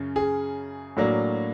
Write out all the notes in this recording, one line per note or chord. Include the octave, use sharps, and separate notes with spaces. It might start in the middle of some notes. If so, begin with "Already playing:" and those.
Already playing: F#2 C#3
G#4
A2 F#3 A#3 D4